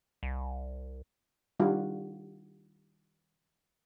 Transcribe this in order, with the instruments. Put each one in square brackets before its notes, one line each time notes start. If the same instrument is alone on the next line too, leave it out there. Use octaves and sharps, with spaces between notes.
[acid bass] C2
[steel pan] D#3 G3 D4 F4 F#4